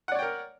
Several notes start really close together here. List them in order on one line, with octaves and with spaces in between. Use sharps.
F#5 D5 C#5 G5 A#4